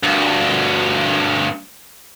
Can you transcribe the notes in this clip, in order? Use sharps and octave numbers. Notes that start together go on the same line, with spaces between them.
D2 G2